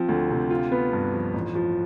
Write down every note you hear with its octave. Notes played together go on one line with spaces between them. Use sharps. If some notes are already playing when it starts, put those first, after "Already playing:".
Already playing: F3 C4
D2
C3
F4
B3
G2
F3
A1
F3